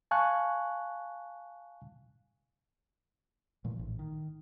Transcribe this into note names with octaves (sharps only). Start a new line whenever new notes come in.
F5 G#5 A5 C#6 F#6
A#2 E3 A3
A#1 A2
D#3